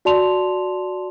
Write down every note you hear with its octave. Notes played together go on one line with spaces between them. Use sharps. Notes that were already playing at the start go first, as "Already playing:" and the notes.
F#4 D5 A5 C6 F7